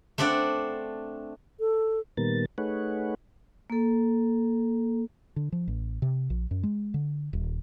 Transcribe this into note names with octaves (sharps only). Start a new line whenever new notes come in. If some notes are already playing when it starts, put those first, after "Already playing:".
A3 C4 D4 D5 F#5
A4
A#2 D#3 G3 B3 A#4 A6
A3 D#4 G#4 B4 C#5 F#5
A#3 A4
D3
F3
A1
C3
A#1
F#2
G#3
D3
D#1